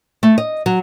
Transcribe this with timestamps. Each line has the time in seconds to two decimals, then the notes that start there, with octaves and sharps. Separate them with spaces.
0.23 A3
0.38 D#5
0.66 F#3